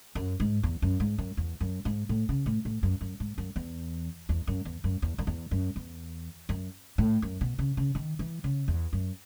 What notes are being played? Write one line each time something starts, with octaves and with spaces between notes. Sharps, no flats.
F#2
G#2
E2
F#2
G#2
F#2
E2
F#2
G#2
A2
C#3
A2
A2
F#2
F#2
G#2
F#2
E2
E2
F#2
E2
F#2
E2
F#2
E2
F#2
E2
F#2
A2
F#2
B2
C#3
C#3
D#3
E3
C#3
E2
F#2